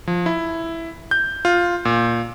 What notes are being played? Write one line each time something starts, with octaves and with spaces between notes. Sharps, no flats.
F3
E4
G6
F4
A#2